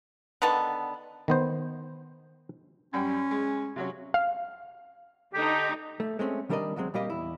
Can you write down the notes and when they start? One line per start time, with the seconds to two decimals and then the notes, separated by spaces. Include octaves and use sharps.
0.42 D3 D#3 B3 A5
1.28 D#3 B3 C5
2.93 F#2 G3 C#4 G5
3.31 G#3
3.76 C3 F#3 C#4
4.14 F5
5.34 D3 D#4 G4
6.00 A3
6.19 G#3 A3 C4 C#4
6.49 D#3 G3 D4 A#4 D5 D#5
6.76 D2 F#3 G#3 C4
6.94 A#2 G3 A#3 G4 D#5
7.10 E2 E4